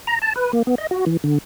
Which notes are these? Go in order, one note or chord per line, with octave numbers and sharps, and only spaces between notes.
A#5
A5
B4
A#3
B3
D#5
F#4
E3
D3